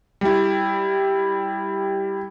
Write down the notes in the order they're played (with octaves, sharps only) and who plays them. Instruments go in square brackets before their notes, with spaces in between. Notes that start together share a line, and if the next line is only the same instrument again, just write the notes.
[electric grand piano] G3 E4